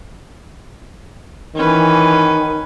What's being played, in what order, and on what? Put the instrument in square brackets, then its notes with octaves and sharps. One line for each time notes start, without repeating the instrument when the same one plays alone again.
[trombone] D#3 [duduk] E3 [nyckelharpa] C#4 B4